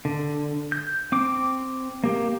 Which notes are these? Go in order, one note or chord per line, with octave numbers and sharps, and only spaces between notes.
D3
G6
C4 D6
A#3 G4